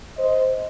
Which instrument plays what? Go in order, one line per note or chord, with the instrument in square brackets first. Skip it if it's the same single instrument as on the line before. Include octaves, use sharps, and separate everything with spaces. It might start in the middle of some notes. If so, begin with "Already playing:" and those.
[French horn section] C5 D#5